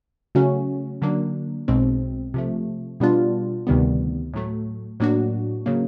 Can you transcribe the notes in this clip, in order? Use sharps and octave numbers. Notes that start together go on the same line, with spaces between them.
C#3 F#3 A3 C#4 F#4
D3 F#3 A#3 D4
B1 B2 G#3 C4
C3 F3 A3
B2 G3 B3 D4 F4
D2 C3 D#3 G3 B3
A2 F#3 A3
A2 F#3 A#3 D4 F#4
C#3 F#3 A#3